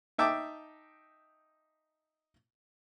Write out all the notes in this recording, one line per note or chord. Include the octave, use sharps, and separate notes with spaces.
D#4 E5 G5 A5 D6